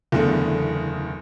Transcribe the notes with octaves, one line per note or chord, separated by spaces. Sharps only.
F#1 E2 D3 A3